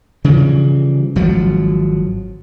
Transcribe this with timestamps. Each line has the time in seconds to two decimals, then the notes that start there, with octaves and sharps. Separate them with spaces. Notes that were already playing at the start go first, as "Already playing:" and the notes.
0.24 C#3 E3 F3 G3
1.16 G#1 F3 F#3